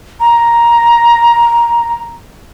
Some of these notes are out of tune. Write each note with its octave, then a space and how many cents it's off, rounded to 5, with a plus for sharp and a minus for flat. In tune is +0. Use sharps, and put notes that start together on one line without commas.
A#5 +10